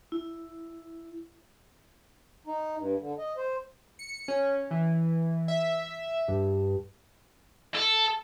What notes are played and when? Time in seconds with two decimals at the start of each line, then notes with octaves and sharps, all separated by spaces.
0.12 E4
2.47 D#4
2.77 G2
3.00 D3
3.18 D#5
3.37 C5
3.99 C#7
4.28 C#4
4.71 E3
5.48 E5
6.28 G2
7.75 A4